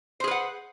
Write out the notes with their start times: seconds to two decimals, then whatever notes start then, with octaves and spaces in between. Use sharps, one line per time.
0.20 C5
0.24 G#4
0.28 B4
0.31 F#5